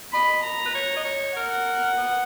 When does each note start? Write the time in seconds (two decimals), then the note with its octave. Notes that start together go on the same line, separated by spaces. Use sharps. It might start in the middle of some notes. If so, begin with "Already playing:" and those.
0.13 D#5 B5
0.44 A#5
0.66 B4
0.75 C#5
0.97 D#5
1.05 C#5
1.36 A#4 F#5
1.97 B3